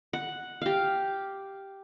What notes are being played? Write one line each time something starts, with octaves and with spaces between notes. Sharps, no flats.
F#5
G4 F5